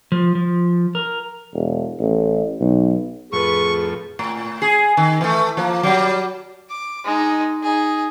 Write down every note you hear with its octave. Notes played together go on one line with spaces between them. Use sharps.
F3
F3
A#4
E1
A1
B1
F2 A2 G#4 B4 C#6
A2
G#4
D#3
E3 A3
F3 A#3
F#3 G3
D6
G#3 D#4
D#4 G#4